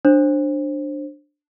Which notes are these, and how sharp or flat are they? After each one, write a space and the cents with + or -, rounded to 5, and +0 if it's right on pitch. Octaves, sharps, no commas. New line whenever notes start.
D4 +5 C5 +25